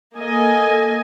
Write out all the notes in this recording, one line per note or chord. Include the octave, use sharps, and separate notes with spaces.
A#3 A4 D#5 G#5